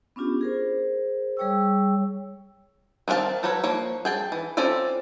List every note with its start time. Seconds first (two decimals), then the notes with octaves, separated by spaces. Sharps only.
0.16 B3 C#4 D4 F4 G4
0.41 G#4 A#4 C5
1.37 G3 G#4 C#5 G5 C#6 E6
3.08 D#3 C4 F#4 F5 A5
3.43 F#3 F#4 A4 B4 C#5
3.64 F3 A#3 C#5
4.05 G#4 G5 A5
4.32 E3
4.57 C4 C#4 F4 A4 D5